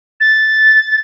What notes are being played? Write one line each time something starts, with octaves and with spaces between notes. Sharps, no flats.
A6